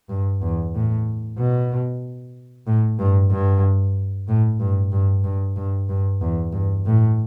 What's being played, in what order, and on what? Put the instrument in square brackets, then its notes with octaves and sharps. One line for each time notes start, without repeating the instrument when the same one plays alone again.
[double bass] G2
E2
A2
B2
A2
G2
G2
A2
G2
G2
G2
G2
G2
E2
G2
A2